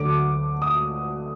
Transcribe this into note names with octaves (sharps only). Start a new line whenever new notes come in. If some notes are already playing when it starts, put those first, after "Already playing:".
Already playing: D2 D3 F#3 D6
D#6